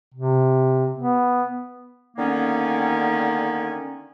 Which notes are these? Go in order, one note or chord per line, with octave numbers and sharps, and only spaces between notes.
C3
B3
D3 D#3 A#3 B3 C#4